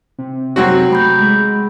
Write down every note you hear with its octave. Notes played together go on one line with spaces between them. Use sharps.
C3
F#3 C4 F#4
A3 B5 G6
G#3